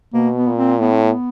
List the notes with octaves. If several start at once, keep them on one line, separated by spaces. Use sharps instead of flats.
B2 A#3
B3
A#2
C4
A2 B3
C4
B3